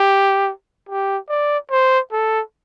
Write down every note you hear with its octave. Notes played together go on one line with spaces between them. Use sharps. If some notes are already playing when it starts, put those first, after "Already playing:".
Already playing: G4
G4
D5
C5
A4